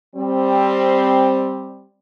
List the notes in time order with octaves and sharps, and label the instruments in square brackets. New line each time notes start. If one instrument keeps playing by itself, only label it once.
[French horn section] G3 C4